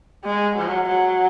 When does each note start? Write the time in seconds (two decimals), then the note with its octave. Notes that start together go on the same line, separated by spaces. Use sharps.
0.24 G#3
0.56 F#3
0.88 F#3